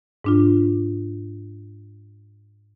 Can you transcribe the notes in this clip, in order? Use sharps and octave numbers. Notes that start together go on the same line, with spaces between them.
G#2 D4 F4